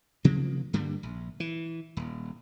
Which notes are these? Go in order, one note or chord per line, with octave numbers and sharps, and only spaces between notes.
C3 F3 A#3 C4
G2 D3 G3 A#3
A#1
E3
D#1